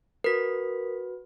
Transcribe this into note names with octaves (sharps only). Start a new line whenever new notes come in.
F#4 A#4 B4 B6